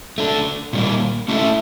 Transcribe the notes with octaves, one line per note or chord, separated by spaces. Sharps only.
A3 D4 A4
A#2 G3 A#3
A3 C#4 E4 A4 E5